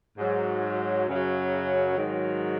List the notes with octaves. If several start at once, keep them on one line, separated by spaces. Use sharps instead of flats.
G#2 F#3
F#2 C#3 F#3
G#2 D#3 F#3